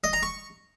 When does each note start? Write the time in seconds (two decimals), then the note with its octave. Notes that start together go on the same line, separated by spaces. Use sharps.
0.04 D#5
0.13 A#5
0.23 C#6